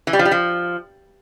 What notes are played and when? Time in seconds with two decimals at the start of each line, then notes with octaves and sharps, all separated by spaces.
0.07 E3
0.13 G3
0.19 F3
0.25 G3
0.31 F3